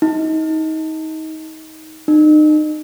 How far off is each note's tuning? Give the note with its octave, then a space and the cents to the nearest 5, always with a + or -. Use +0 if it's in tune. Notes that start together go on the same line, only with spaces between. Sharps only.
D#4 +25
D#4 -35